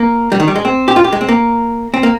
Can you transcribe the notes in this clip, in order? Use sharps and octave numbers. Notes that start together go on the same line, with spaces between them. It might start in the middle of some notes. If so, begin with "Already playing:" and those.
Already playing: A#3
G3
D#3
G3
G#3
C4
G4
F4
G4
G#3
C4
A#3
C4
A#3